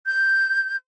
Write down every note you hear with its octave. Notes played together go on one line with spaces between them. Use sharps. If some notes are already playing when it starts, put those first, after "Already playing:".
G6